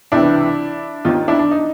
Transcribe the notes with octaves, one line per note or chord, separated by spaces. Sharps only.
C#2 C3 E3 D4 E4
D#2 D#3 D#4 F4
D4 E4
D4
D#4